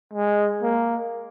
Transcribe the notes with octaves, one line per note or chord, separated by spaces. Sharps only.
G#3
A#3